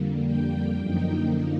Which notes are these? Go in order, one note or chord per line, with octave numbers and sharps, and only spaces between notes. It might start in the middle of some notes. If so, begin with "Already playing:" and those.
Already playing: F2 D3 G3 A#3
G5
F#2 D3 F3 A#3 D#4